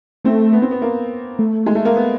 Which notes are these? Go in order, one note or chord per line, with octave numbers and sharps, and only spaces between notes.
A3 C4
B3
C4
B3
A#3
A3
G#3
A3
A#3
B3